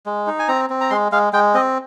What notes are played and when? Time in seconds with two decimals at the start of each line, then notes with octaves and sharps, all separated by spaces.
0.06 G#3
0.27 D#4
0.39 G#5
0.48 C4 A#5
0.70 C4
0.81 A#5
0.90 G#3 C6
1.12 G#3 F5
1.33 G#3 G5
1.54 C4 D#5